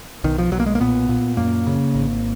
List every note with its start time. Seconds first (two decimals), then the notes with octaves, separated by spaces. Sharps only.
0.24 B1 D#3
0.38 F3
0.52 B1 F#3
0.60 A#3
0.66 G#3
0.75 A#3
0.80 A#2 B3
1.09 A#2
1.37 F#2 A#3
1.67 C#3
1.94 G#1